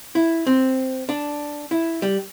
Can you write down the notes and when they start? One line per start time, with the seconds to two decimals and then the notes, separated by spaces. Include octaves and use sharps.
0.15 E4
0.47 C4
1.09 D4
1.71 E4
2.02 G3